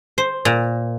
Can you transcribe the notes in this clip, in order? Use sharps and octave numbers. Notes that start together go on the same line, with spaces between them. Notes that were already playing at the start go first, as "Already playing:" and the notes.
C5
A#2